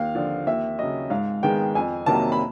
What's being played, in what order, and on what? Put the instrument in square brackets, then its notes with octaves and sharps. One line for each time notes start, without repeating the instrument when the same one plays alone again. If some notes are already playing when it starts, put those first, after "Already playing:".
Already playing: [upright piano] D#2 F5
D3 F3
D#2 E5
C#3 F#3 D#5
G#2 F5
D#3 G#3 B3 G5
F2 G#5
C3 D#3 F#3 A#3 A5
B5